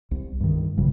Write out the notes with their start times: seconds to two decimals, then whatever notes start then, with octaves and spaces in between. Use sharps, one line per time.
0.11 C2
0.40 G2 D#3
0.77 A#1 F#2 C#3 G3